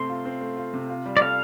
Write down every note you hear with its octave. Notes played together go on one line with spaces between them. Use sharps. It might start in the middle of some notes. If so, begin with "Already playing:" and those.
Already playing: C3 A3 C4 C6
F4
C4
A3
F4
C3
F4
G3
D5
A4 F5